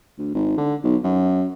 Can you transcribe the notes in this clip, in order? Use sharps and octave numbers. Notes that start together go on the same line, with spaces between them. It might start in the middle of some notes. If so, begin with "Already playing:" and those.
D2
G#1
D3
B1
F#2